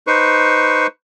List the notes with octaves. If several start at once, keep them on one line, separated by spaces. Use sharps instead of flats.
D#4 B4 C5 C#6